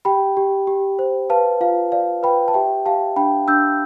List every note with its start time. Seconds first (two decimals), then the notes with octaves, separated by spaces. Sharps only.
0.05 G4 G5 B5
0.37 G4
0.67 G4
0.99 C5
1.30 B4 F5 A5
1.61 F4 F5
1.92 D5 F5
2.23 B4 G5 B5
2.48 A5
2.54 G4 E5 G5
2.86 G4 F5 A5
3.16 D4 G5 B5
3.48 D4 E6 G6